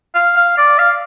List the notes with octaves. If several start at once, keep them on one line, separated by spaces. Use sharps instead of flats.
F5
F5
D5
F5